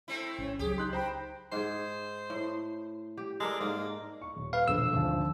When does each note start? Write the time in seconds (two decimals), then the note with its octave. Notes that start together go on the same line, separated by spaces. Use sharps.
0.08 A3 C4 E4
0.38 G#1 C#4
0.59 C#2 F#3 G4 G#4
0.78 D#4 C6 F#6 G6
0.93 C5 G5 A#5 B5
1.52 G#2 G#4 C5
2.30 A2
3.17 G4
3.40 G#3 A4 A#4 D5
3.60 G#2 A#3
4.22 C#6
4.36 D#1
4.53 B4 F5
4.68 E1 A#1 D3 E6
4.92 G#1 D2 F3